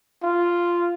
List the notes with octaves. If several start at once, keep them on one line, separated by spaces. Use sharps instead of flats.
F4